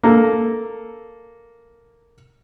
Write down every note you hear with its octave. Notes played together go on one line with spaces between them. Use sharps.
A#3 A4